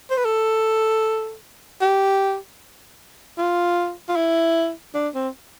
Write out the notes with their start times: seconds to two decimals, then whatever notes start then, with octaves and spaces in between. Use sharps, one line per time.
0.10 C5
0.17 B4
0.25 A4
1.81 G4
3.38 F4
4.09 F4
4.16 E4
4.95 D4
5.15 C4